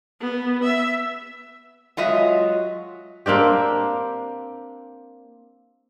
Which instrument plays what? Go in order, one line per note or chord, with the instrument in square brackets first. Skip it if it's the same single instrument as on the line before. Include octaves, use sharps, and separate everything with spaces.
[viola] B3
E5
[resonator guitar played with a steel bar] F#3 G#3 F4 D#5 E5
[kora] A#3 C4 D4 G4